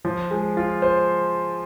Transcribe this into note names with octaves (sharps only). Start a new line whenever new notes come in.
F3
G#3
F4
C5